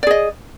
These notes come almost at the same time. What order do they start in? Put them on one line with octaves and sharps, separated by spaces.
D5 G#4 D#5